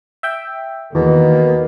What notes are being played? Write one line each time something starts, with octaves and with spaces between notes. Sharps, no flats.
E5 G5
E2 B2 D#3 A#3